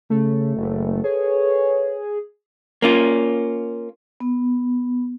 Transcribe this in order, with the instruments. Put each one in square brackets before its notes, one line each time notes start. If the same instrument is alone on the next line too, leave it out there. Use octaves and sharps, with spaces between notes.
[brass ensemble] C#3 [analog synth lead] A3
[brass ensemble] F#1
[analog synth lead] G#4 [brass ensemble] A4 B4 C#5
[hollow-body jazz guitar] A#3 C#4 F4
[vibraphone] B3